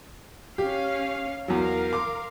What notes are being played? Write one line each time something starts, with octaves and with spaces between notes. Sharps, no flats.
C#4 G4 F5
E2 F#3 A#4 F5
C6 D6